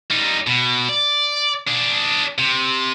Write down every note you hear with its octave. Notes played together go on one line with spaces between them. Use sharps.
G3 D#4
B2
D5
D4 G#4
C3